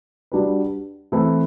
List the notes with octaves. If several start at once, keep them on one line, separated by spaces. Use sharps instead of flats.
G3 D4 F#4 B4
E3 A3 C4 E4